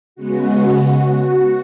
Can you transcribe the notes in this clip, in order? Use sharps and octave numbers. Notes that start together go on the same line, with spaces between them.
C#3 G#3 B3 F#4